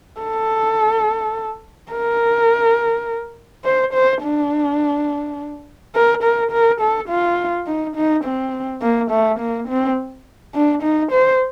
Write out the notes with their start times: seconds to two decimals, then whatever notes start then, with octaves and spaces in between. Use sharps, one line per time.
0.20 A4
1.92 A#4
3.64 C5
3.93 C5
4.23 D4
5.95 A#4
6.23 A#4
6.51 A#4
6.81 A4
7.09 F4
7.67 D#4
7.96 D#4
8.25 C4
8.81 A#3
9.11 A3
9.39 A#3
9.68 C4
10.54 D4
10.83 D#4
11.12 C5